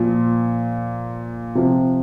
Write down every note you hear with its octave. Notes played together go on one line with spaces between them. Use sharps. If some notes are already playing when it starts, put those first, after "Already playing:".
Already playing: A#2 F3
C3 F3